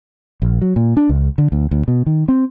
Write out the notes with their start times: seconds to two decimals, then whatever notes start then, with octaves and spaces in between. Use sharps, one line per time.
0.42 A#1
0.61 F#3
0.76 A#2
0.97 D4
1.09 C#2
1.38 D3
1.52 D2
1.71 D2
1.88 B2
2.06 D#3
2.28 C4